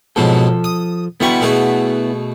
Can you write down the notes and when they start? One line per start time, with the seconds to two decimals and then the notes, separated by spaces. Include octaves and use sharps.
0.16 G#2 B2 F3 F#3 A4
0.64 D#6
1.20 D3 G3 B3 E4 F#4 C#6
1.41 B2 A3 G#4